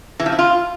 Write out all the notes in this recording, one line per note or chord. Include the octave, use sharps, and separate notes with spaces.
E3
F3
E4
F4